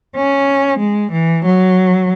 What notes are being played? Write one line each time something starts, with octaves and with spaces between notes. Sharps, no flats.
C#4
G#3
E3
F#3